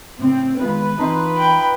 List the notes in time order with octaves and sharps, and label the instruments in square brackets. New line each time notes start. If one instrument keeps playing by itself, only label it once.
[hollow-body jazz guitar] A2 C#3 [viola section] C4
[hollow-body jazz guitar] D#3 G#3 B3 [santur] F4 [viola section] B4
[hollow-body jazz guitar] E3 C4 A5 [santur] D#4 C6
[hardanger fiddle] G5 B5